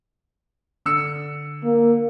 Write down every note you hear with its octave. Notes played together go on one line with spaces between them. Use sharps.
D3 E6 C#7
A#3